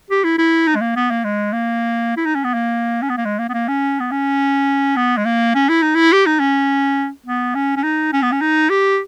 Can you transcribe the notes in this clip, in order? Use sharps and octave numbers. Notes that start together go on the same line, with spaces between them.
G4
E4
E4
D#4
G#3
A#3
B3
A#3
G#3
A#3
E4
D#4
C#4
B3
A#3
C#4
B3
A#3
G#3
A#3
B3
A#3
C#4
B3
C#4
B3
G#3
A#3
C#4
E4
D#4
E4
G4
D#4
C#4
B3
C#4
C#4
D#4
C#4
B3
C#4
D#4
G4